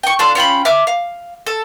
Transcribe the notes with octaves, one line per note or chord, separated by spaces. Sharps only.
G5 C#6
D4 F4 A4 C6
C#4 F4 G5 B5
E5 D6 F6
F5
A4